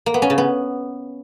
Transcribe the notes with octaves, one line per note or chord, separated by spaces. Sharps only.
A#3
B3
C#4
C#3
B3